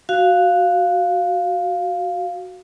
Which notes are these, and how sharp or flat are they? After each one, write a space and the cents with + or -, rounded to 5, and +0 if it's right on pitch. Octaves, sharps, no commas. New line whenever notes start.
F#4 +0 F5 +0